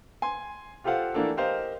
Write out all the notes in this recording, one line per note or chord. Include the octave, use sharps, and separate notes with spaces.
G#5 C6
F4 G4 A4 C5 F5 F#5
E3 A3 A#3 D4 A4
G4 A#4 C5 D#5 F5